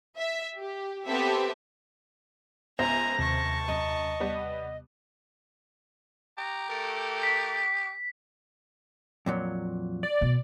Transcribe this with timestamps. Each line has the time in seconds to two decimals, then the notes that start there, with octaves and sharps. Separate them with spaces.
0.17 E5
0.58 G4
1.06 B3 C4 G4 A4 E5
2.79 C#2 B3 C5 E5 G#5 A#5 A#6
3.19 D#2 C3 A5 C#6
3.68 F#2 D#5
4.20 G3 B3
6.38 G4 A#5
6.70 A3 A4 A#4
7.23 B6
9.26 F2 A#2 F#3
10.03 D5
10.21 B2